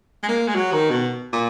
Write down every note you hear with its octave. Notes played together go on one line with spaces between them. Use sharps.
G#3
A#3
G#3
F#3
D#3
B2
A#2